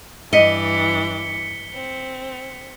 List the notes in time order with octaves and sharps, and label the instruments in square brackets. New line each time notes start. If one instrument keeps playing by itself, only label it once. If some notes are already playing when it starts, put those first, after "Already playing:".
[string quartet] G2 E3 D6 [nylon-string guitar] D#5 [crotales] B6 C#7 G7
[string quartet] C4